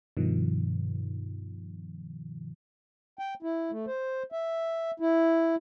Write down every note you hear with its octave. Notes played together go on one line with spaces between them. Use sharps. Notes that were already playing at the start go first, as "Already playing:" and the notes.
G2 B2 D#3 F3
G5
E4
A3
C5
E5
E4